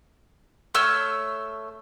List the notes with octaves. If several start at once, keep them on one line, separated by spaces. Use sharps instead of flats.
A3 C#5 E6 F6